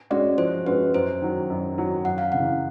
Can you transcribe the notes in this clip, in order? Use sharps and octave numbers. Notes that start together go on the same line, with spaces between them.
G#3 C#4 F#4 D5
F3 C5
G#3 C#4 F#4 B4
F#2 C5
D#3 F#3
F#2
D#3 F#3
F#2 F#5
F5
C#3 E3 F#5